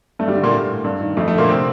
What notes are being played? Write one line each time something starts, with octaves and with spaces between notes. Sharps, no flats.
G2 A3
G3
D3
A#2 A#3
A2
G2
D#3
F2 A3
A3
D3
A#2 A#3
C3 C4